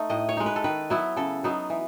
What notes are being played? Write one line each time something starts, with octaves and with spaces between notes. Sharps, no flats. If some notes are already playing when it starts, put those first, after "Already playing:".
Already playing: A3 D#4
A2 D#5
C#5
G#3 D#4
B4
A4
D#3 B4
F#3 B3 E4
C#3 A4
F#3 B3 D#4
E3